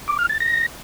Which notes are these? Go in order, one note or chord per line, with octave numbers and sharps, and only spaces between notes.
D6
F6
A6
A#6